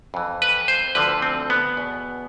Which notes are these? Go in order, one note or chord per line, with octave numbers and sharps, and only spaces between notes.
F2 E3
B4
C5
D2 D3 F3 B4
C4
B3
E2 B2